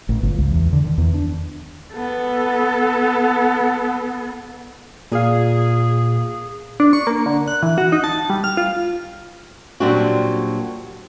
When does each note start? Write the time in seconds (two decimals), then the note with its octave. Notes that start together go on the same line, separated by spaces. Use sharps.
0.09 A1
0.23 G1
0.37 C#2
0.51 E2
0.73 D3
0.84 D#3
0.98 E2
1.14 D4
1.94 B3 A4
5.12 A#2 G#4 F5
6.80 D4
6.93 C#6
7.07 A#3
7.26 D3
7.48 F#6
7.63 E3
7.78 F#4
7.92 D#4
8.04 A5
8.30 G3
8.44 F6
8.57 F4
9.80 A#2 F#3 G3 C4 D4 F#4